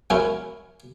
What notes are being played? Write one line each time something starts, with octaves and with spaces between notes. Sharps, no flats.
F#3 G#3 C#4 E4 A#4